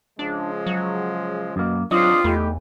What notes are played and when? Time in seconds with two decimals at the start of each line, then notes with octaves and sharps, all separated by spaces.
0.19 C#3 F3 G#3 D4
0.66 F#3
1.56 F#2 B2 A#3
1.91 G#2 F#3 C4 D4 F4 D5 D#5
2.24 E2 A3 D#4 G4 B4